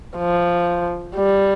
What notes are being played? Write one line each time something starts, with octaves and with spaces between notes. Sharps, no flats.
F3
G3